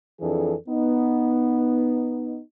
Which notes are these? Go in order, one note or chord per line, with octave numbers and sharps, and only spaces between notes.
F2 E3 D4 G#4 A4
B3 D#4